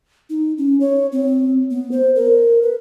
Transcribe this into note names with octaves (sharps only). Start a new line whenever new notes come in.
D#4
C#4
C#5
C4
B3
C5
A#4
B4